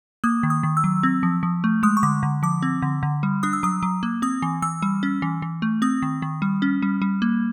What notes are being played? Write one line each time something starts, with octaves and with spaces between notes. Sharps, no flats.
A#3 D#6
D#3
D#6
D#3
E6
F#3
C4
F3
F3
A3
G#3 D#6
C#6
D3 D6
D3
F3 D6
C4
D3
D3
G3
D4 D#6
E6
F#3 D#6
F#3
A#3
C4 D#6
E3
E3 E6
G3
C#4
E3
E3
A3
C4 D#6
D#3
D#3
G3
C#4
G3
G3
A#3